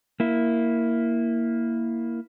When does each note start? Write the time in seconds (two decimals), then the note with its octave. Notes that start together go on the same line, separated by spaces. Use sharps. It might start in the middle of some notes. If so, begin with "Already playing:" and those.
0.20 A#3 E4